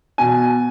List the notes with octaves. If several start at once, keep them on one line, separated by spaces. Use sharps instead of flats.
B2 G#5